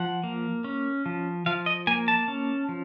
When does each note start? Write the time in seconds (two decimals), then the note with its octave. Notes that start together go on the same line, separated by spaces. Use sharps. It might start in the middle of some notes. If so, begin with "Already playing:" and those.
Already playing: F3 F#5
0.24 A#3
0.64 C#4
1.06 F3
1.46 F3 F5
1.66 D#5
1.87 A#3 G#5
2.08 A5
2.28 C#4
2.69 F3